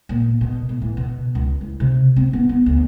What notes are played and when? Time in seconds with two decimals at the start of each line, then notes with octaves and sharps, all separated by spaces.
0.09 A#2
0.41 B2
0.69 A2
0.82 E3
0.97 B2
1.35 C#2
1.61 E4
1.80 C3
2.16 C4
2.33 B3
2.49 B3
2.66 D2